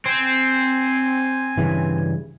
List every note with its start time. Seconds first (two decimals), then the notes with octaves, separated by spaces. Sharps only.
0.06 C4 G#5
1.58 G2 C#3 E3